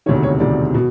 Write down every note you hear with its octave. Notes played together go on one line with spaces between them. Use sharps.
E1 D2 C3 D#3 C#5
C#5
E1 D2 C3 D#3 D5
B2